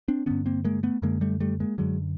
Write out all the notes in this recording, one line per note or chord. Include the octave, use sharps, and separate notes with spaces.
C4 D4
G2 D3 B3 C#4
A#3 C4
G#3 A#3
A3 B3
F#2 D3 G#3 A#3
G3 A3
G3 A3
G#3 A#3
F#2 D3 F#3 G#3